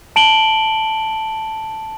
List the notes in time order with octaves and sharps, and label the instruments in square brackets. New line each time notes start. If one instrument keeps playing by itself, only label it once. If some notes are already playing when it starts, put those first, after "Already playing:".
[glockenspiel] A5 D7 F#7 G7